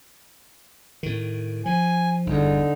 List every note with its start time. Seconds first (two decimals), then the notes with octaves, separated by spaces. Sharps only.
1.03 A2 D#3
1.66 F3 G#5
2.27 G1 E2 D3 D#4